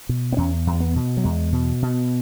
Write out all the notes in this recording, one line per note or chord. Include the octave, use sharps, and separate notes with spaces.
B2
B3
E2 C#4
E2
B3
B2
F#3
E2 G#3
B2
B2